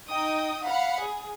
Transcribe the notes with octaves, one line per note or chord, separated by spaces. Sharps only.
D#4 D#5 G5 D#6
F5 F#5 B5 C#7
G#4